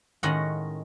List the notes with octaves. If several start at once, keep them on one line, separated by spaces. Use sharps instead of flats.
A2 D#3 G#3 C#4 D#5 F#5